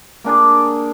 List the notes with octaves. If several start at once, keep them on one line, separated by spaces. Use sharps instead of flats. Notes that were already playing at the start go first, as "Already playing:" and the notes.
A#3 D4 G#4 D5